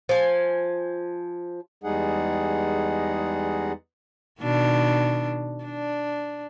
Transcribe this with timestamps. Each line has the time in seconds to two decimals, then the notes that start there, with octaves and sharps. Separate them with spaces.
0.09 F3 G#5
1.84 E2 G3 G#3 D#4 G#4 F#5
4.40 B2 D#3 D4
5.64 D4